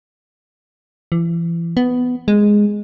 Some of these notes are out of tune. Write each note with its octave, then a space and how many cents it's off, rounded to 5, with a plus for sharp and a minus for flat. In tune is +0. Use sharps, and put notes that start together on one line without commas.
E3 +35
B3 +10
G#3 -5